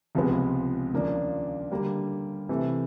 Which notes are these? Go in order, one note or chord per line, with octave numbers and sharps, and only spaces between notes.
C#2 C3 F3 G#3 B3
D#2 C#3 F3 A#3 D4
D3 G3 A#3
C3 E3 A3